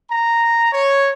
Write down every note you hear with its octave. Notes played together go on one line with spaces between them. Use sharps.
A#5
C#5